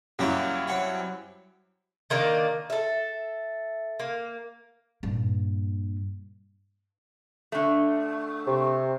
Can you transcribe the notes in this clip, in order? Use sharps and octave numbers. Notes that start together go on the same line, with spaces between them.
F#2 G3 A#3 C#4 E4 F#4 G4
F#3 C4 F#5 G5
D#3 A#3 D4 D#5
A4 E5
A#3
G2 A#2
D3 A3
C3